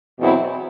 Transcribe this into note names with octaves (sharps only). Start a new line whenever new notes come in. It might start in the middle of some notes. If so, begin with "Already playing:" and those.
E2 B2 F#3 C4 E4